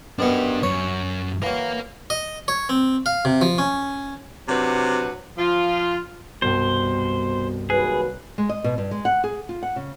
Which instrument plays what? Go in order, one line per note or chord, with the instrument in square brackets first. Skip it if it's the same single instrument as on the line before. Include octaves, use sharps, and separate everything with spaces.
[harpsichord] F#2 B2 B3 [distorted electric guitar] D4 G4
[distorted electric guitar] F#2 [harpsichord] C#5
[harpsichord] E3 F#3 [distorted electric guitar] A#4 F5
[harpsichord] D#5
C#5
C4
F5
C3
F3
C#4
[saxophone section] C3 F#3 D4 F#4 B4
F3 F4
[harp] C2 G2 G5 [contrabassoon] B2 [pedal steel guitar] C5
[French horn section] D#2 F#3 B4 [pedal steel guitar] G#4 [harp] F#6
[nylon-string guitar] G#3
D#5
B2
G2
G#3
F#5
G#4
F4
F#5
C#3